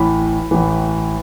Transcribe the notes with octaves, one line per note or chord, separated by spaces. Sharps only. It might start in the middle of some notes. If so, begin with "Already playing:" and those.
Already playing: A1 A2 E3 B5
A1 A2 E3